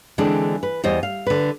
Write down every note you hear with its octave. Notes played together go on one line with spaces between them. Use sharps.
D3 E3 G#3 C4 D4
B4
E2 G3 C5 D#5
F5
D3 B4